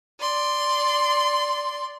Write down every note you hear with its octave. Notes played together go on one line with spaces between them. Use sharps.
D5 C6